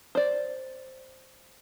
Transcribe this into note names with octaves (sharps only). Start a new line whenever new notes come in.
C5 D5